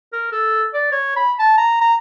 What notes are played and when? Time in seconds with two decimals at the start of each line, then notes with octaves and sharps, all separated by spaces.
0.13 A#4
0.32 A4
0.74 D5
0.92 C#5
1.16 B5
1.39 A5
1.57 A#5
1.81 A#5